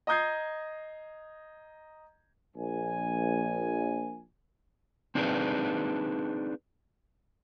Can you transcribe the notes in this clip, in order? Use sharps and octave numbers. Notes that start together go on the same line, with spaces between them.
D#5 A#5 D#6 G6 G#6 C7
A#1 G#5
C4 D4 D#4 G#4 A#4 B4